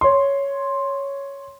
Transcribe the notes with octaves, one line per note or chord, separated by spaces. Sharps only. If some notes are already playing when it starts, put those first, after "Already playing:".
C#5 C6